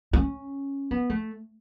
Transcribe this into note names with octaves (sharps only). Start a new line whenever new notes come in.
C#4
B3
A3